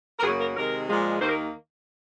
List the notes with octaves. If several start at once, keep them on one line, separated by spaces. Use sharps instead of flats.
A#4
F#2 C#3 F#3 A#3 G#4
A#4
C3 D#3 G#3 A#4
A#2 F3 G#3
D#2 D#3 A#3 C5
A#4